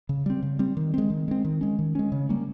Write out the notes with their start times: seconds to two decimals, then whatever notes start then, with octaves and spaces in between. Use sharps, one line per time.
0.09 C#3
0.26 G3 C4
0.42 C#3
0.59 G3 C4
0.77 D#3
0.94 G#3 C4
1.10 D#3
1.28 G#3 C4
1.44 D#3
1.61 G#3 C#4
1.79 D#3
1.95 G#3 C#4
2.12 C#3
2.29 G3 A#3 C#4